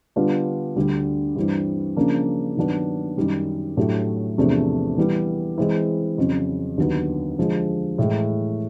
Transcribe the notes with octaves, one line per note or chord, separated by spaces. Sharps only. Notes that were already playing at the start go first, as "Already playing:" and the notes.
D3 G3 B3 D4 F4
D2 D3 G3
G2 E3 G3 C4
C#3 F3 A#3 D4
G2 D#3 F#3 B3 D4
F#2 D#3 G3
A2 F#3 A3 D4 G4
E2 C3 F3 A3 D4
E3 G3 B3
E3 G#3 C4 E4
F2 C#3 F#3
D#2 D3 F#3 B3 D#4
D3 F3 G#3
A2 E3 G#3